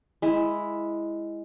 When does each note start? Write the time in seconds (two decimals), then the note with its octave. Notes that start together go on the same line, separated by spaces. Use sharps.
0.22 G#3 E4